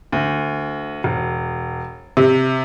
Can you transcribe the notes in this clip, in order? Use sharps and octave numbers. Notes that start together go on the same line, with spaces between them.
D2
E1
C3